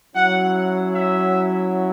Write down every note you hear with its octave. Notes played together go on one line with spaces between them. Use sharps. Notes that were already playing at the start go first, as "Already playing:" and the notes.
F#3 C#4 E4 F#5
E5